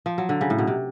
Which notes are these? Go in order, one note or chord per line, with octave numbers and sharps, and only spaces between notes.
F3
F#3
D3
C#3
A2
B2
C3